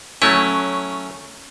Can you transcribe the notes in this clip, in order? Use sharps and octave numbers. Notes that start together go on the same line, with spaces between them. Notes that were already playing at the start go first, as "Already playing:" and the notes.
F#3 A3 C#4 E4